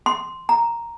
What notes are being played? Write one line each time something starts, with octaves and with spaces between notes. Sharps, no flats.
C6
A#5